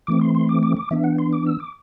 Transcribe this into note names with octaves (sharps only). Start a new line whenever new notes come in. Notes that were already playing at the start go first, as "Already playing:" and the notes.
E3 A3 C4 D6
C6
C6
D6
D6
D6
E3 B3 D4 E5
F#5
C6
D6
E6
D6